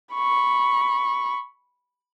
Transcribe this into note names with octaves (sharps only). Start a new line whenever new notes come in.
B5 C#6